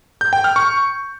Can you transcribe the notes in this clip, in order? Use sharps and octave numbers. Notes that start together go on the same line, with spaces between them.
G6
G5
F6
C#6